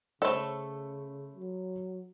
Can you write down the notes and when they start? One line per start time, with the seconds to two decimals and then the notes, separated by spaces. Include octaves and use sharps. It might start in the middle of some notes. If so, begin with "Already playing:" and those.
0.22 C#3 A3 A4 C5 C#5 B5
1.35 F#3